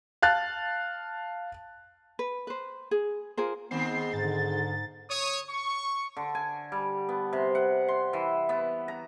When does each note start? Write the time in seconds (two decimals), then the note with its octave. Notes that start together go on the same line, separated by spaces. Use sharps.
0.22 F5 A5 F#6 A6
2.19 B4
2.47 B4 C5
2.91 G#4
3.37 F4 G#4 A#4 C5
3.71 D#3 G#3 B3 C4 C7
4.13 G#2 D3 A6
5.10 C#5 D#6
5.49 C#6
6.17 D3
6.35 G#5
6.72 G3
7.09 B3
7.33 C3
7.55 F#5
7.88 C6
8.13 E3
8.49 B3
8.88 A#5